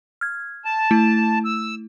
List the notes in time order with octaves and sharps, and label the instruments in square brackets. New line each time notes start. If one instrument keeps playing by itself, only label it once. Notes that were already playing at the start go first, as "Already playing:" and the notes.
[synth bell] F6 G#6
[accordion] A5
[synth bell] A3 E4
[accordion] E6